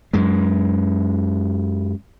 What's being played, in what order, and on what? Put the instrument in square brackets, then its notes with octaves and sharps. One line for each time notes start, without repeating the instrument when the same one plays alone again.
[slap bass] F#2 G#3